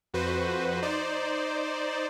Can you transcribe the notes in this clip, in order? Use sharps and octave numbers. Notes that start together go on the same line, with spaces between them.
F2 F#4 B4 C5
D#4 C5 D5